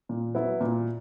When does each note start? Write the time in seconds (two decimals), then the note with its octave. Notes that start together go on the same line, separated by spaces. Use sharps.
0.09 A#2
0.35 F#3 B3 E4
0.61 A#2